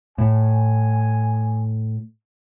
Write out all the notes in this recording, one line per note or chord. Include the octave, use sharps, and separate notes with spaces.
A2 G#5